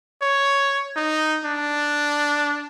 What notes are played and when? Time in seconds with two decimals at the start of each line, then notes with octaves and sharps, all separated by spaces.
0.22 C#5
0.96 D#4
1.45 D4